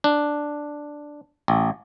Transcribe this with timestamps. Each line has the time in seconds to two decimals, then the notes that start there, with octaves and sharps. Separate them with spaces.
0.04 D4
1.48 A1